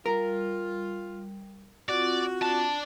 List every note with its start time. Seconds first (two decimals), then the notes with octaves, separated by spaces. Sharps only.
0.06 G3 F4 A#4
1.89 C4 F4 F#4 D5
2.42 D4 A5